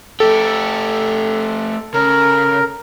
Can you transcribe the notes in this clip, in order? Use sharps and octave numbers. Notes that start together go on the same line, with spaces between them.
A3 G4 A4
C#3 A#4